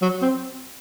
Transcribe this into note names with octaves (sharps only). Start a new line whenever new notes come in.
F#3
C4